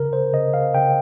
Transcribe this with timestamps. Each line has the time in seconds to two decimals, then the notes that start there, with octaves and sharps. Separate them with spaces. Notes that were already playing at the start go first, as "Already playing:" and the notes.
Already playing: C#3 A#4
0.13 C#3 C5
0.33 C#3 D#5
0.54 C#3 F5
0.74 C#3 G5